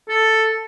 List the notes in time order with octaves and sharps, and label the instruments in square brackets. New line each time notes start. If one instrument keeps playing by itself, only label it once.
[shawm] A4